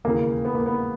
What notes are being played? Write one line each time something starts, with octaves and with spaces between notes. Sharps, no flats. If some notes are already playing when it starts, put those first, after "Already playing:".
E1 D#2 C#3 E3 A#3
B3
A#3
B3